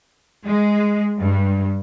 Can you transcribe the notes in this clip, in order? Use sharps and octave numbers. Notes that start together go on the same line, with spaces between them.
G#3
G2